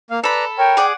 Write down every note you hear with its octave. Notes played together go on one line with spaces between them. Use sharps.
A#3 F5
A4 B4 D5 A#5 B5
A#4 C#5 G5
G#4 D5 F#5